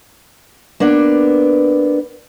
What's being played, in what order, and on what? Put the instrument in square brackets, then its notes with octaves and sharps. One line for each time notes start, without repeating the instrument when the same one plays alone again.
[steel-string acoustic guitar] A#3 B3 D4